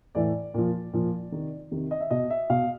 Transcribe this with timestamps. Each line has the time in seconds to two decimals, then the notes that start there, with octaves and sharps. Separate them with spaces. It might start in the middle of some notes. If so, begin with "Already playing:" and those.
0.15 A2 E3 D5
0.54 A#2 F3
0.93 A#2 F3
1.32 C3 D#3
1.71 C3 D#3
1.91 D#5
2.01 E5
2.11 B2 D#5
2.30 E5
2.50 B2 F5